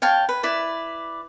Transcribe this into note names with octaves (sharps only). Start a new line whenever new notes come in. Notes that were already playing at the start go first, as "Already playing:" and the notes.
C#5 F5 G5 A5
B4
E4 B4 D5